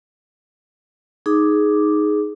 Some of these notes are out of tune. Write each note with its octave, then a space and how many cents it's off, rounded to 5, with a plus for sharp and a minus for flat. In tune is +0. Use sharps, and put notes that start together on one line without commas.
D#4 +0 G#4 +10 D6 +0